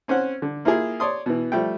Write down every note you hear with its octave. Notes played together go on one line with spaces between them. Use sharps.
C4 C#4 C5 F#5
D3
A#3 E4 F4 G#4
C#5 D5 C6 D#6
B2 E3
F3 G3 A3 G5